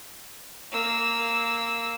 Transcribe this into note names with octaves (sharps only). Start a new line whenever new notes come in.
A#3 E6